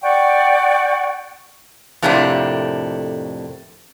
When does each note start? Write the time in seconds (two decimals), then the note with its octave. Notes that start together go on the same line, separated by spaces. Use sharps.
0.02 D5 F#5 G5 C#6
2.02 F2 A2 C3 A3 A#3 D4